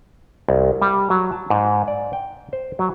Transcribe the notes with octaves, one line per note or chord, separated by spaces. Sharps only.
C2
G3
F#3
A5
G#2
D5
G5
C5
F#3